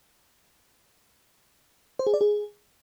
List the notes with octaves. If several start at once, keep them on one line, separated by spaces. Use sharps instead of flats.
C5
G#4
D5
G#4